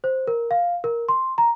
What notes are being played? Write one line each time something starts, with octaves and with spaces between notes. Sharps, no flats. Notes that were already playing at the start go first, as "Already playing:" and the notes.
C5
A#4
F5
A#4
C6
A#5